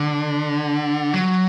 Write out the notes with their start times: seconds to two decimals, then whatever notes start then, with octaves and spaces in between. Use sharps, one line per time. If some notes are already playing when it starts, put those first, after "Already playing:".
Already playing: D3
1.14 F#3